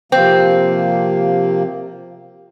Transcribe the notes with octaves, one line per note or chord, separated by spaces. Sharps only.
C3 F3 A#3 C4